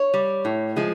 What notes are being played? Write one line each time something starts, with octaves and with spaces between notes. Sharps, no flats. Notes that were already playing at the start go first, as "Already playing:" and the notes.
Already playing: C#5
G3
A2
F3 G#3